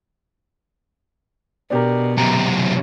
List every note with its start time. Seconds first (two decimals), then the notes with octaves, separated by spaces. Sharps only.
1.70 B2 D4 G4 A#4
2.18 F#2 C3 A#5